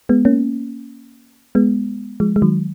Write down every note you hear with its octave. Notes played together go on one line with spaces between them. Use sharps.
G#3 B3
A#3 C#4
G#3 B3
F3 G#3
G#3
D#3 F#3